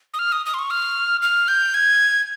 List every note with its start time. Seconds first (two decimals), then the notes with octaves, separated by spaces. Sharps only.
0.14 D#6
0.19 F6
0.32 D#6
0.46 D#6
0.54 C6
0.59 C#6
0.70 F6
1.22 F6
1.48 G6
1.74 G#6